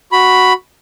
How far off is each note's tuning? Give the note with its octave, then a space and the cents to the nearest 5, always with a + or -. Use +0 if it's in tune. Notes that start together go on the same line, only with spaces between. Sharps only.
F#4 +0 B5 +0